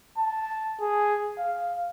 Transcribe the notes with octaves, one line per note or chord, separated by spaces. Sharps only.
A5
G#4
F5